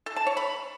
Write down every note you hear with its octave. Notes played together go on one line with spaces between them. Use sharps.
A4
A5
C#5
B5